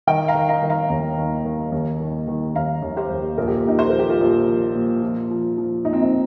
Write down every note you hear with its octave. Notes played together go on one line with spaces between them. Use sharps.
D#3 D#5 G5
F5 A#5
D#3
F5 A#5
D#3
F5 A#5
D#2
D#3
D#3
D#2
D#3
D#3
D#2 F5 A#5
D#2
G4 C5
D#2
A#1 A#4
G4
F4
A#1 D#4 G4
C5
F3 A#4
G4
F4 A#4
A#1
F3
A#2
F3
F3
F3
A#1 D#4
C4
D#4